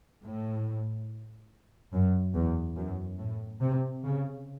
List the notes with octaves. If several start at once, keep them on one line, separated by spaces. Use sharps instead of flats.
A2
F#2
E2
F#2
A2
C3
C#3